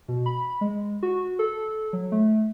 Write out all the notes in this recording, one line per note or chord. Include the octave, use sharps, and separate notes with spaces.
B2
B5
G#3
F#4
A4
F#3
A3